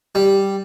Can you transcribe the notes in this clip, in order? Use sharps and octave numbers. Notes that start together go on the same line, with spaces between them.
G3